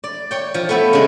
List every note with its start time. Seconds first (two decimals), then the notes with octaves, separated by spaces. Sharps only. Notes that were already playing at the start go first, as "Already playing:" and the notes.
0.04 D5
0.31 C#5 G5
0.54 F3
0.69 A3 B3 E4
0.93 C#3 G#3